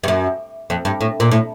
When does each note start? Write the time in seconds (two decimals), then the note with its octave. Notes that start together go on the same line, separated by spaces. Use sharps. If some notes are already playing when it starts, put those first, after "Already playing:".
0.04 G2
0.08 F#2
0.70 F2
0.85 G2
1.01 A2
1.20 A#2
1.31 A2